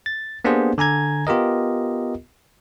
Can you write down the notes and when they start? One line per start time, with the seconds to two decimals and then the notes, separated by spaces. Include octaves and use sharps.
0.06 A6
0.44 A#3 B3 D4 G4 G#4 C5
0.78 D3 G#5 A#5 G#6
1.27 B3 F4 G4 A#4 D#5